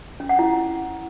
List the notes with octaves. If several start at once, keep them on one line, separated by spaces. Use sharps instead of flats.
C#4
F#5
E4